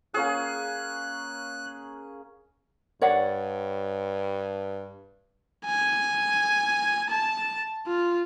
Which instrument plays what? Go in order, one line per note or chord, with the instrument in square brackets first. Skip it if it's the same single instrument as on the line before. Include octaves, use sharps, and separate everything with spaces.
[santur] A#3 C#4 G#4 [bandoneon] F#6
[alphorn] G2 [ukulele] C#5 D5 F#5
[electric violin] G#5
A5
F4